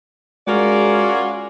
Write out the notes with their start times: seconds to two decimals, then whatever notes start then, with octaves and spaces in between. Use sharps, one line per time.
0.48 G#3 C#4 F4 F#4 A#4 D5